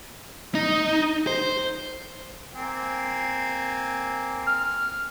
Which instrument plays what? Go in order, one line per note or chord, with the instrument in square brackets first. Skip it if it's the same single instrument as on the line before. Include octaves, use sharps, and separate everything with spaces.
[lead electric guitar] D#4
C5
[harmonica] A#3 C4 G#5
[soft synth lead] F6